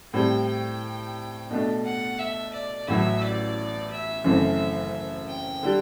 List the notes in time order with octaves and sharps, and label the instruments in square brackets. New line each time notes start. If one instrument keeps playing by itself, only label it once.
[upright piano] A2 G3 C4 [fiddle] G5
[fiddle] G5
[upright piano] B2 A3 D4
[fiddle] F#5
E5
D5
[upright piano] A1 A2 F#3 [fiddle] E5
[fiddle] D5
E5
[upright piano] F#1 F#2 E3 A3 C4
[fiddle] G5
[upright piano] D3 G3